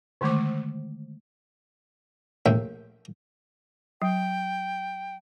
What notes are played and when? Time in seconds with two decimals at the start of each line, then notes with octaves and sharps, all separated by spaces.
0.21 D3 D#3 G#3 A3 D6
2.46 A#1 A2 E5 G5
4.02 F#3 G5